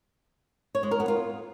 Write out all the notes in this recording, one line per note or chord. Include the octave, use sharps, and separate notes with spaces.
C#5
G#3
A#4
B3
F4